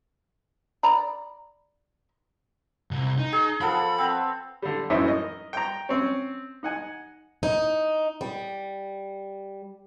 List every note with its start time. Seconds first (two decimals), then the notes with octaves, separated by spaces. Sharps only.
0.83 D5 A#5 B5
2.91 C2
3.18 D#4
3.32 G#4
3.61 F3 B3 A4 B5
3.98 B3 C4
4.62 D3 G3
4.90 F#2 E3 C#4 D#4 C5 E5
5.05 A#4 D#5
5.53 G5 A#5
5.89 C4 C#4
6.63 D#4 F#5 G#5
7.43 D#4
8.21 G3